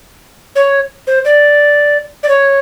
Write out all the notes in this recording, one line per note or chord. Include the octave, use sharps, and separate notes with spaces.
C#5
C5
D5
D5
C#5